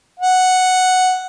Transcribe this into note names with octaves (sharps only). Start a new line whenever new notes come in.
F#5